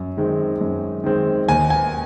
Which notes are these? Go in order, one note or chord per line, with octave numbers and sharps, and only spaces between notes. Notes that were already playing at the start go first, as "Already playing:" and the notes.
Already playing: F#2
D#3 G#3 C4
F#2
D#3 G#3 C4
D#2 G#5
G#5